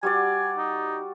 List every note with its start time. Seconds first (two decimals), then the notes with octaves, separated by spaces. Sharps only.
0.03 G3 F#4 D5 G#5
0.58 D#4